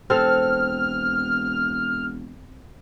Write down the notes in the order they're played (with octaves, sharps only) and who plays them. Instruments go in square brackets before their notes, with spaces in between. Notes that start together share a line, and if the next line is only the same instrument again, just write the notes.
[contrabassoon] E1 [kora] C4 A4 F5 [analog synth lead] F6